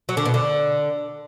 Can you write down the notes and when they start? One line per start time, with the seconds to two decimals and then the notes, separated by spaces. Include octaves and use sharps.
0.09 F#3
0.17 D3
0.25 B2
0.34 D3